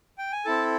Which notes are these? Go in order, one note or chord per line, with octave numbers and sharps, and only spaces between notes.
G5
G#5
C4 E4 A4 A5